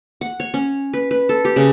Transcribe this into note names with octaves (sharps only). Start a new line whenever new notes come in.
F#5
C#5
C#4
B4
B4
A4
G4
C#3